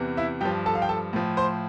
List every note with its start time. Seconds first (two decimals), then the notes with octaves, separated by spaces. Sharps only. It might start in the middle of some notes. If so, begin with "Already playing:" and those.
Already playing: E2 C3 E3
0.17 E4 E5
0.41 G2 F3 G4 G5
0.66 A4 A5
0.75 F5
0.82 G5
0.89 A4 A5
1.13 A2 F3
1.37 C5 C6